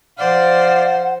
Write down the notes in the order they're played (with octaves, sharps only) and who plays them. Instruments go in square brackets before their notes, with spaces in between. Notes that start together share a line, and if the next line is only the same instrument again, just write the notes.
[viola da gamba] F3 C5 [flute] D5 [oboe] F5 [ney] F#5